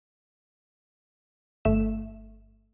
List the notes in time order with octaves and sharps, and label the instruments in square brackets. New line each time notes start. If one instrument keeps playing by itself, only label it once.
[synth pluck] G1 A3 E5 E7